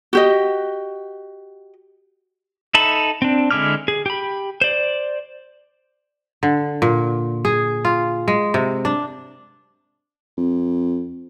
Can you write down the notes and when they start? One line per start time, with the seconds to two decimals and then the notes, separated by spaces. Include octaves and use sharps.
0.13 F#4 G4 D#5
2.74 D#4 A4 E5 A5 B5
3.22 C4 D4
3.51 D3 G#3 E4 D6 F6
3.88 G#4
4.06 G4 B5
4.61 C5 D5
6.43 D3
6.82 A#2
7.45 G#4
7.85 F4
8.28 G#3
8.54 C3
8.85 D4
10.37 F2